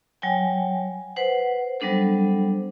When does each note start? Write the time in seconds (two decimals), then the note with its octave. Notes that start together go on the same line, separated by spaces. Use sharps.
0.22 F#3 C#5 G5 G#5
1.16 B4 C5 F#5
1.80 F#3 G3 B3 D4 A4 C5